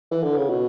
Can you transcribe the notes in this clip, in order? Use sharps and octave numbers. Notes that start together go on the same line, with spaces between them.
E3
D3
C#3
B2